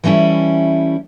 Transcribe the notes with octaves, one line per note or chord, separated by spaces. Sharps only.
E3 G3 A3 C#4 E4